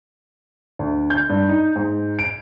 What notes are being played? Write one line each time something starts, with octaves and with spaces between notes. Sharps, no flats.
D2
G6
G2
D#4
G#2
D7